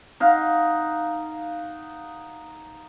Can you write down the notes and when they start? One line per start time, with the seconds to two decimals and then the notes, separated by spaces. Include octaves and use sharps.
0.20 D#4 F5 F#5